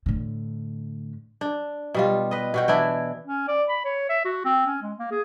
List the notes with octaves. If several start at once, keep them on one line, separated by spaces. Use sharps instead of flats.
A2 D3
D4
B2 G3 F4
B4 D#5
B2 F#4 G5
E3 D4 E4 G5
C#4
D5
B5
C#5
E5
F#4
C4
C#4
G#3
A#3
G#4